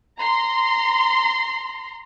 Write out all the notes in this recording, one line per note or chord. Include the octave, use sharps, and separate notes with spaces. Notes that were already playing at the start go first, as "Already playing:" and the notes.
A#5 C6